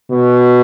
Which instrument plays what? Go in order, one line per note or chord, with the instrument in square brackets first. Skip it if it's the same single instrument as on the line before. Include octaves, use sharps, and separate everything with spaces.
[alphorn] B2